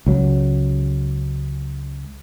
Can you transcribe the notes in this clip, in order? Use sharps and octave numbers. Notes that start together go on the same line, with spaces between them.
C#2 F#3